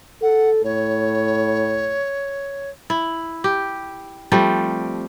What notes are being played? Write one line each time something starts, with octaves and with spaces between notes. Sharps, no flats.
A4 F#5
A2 C#5
E4
G4
F3 G3 A3 C4